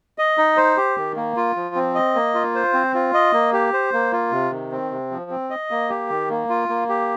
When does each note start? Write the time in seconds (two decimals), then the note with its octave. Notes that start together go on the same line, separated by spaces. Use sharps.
0.18 D#5
0.38 D#4
0.57 C5
0.77 G4
0.97 D#3
1.16 A#3
1.37 F4
1.56 F3
1.75 C4
1.95 D#5
2.15 A#3
2.35 F4
2.55 C5
2.74 C4
2.94 F4
3.14 D#5
3.33 A#3
3.53 G4
3.73 C5
3.93 A#3
4.13 F4
4.32 C3
4.52 D#3
4.72 C4
4.91 C3
5.11 F3
5.30 C4
5.50 D#5
5.71 A#3
5.89 G4
6.09 D#3
6.30 A#3
6.49 F4
6.69 A#3
6.89 G4